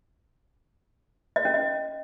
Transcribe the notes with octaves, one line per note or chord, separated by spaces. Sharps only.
D#5
C#4
D#5